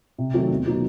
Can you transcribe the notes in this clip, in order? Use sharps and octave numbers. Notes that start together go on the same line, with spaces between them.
C3
D#3 F#3 A3 C4
E2
B2 F#3 A#3 D#4